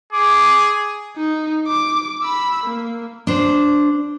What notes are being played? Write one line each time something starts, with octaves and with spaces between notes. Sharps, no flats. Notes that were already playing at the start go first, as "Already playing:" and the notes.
G#4 D6
D#4
D6
B5 E6
A#3
D4 C5